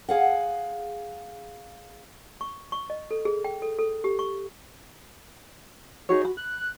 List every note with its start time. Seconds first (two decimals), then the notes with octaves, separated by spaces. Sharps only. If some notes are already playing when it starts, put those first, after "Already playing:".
0.09 G#4 F5 F#5
2.41 C#6
2.72 C#6
2.90 D#5
3.11 A4
3.25 G#4
3.44 G5
3.62 A4
3.79 A4
4.04 G4
4.19 C#6
6.09 D#4 F#4 G#4 C#5
6.25 B5
6.37 F#6